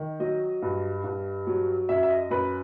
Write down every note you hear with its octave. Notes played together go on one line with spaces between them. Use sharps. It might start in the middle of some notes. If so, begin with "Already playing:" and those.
Already playing: D#3
F#3 D#5
G2
G2
F#3
F#2 E5
E5
D#5
F#2 B4